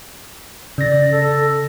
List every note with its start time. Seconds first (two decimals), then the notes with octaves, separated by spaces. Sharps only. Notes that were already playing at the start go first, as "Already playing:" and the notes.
0.78 C#3 D5 A#6
1.11 A4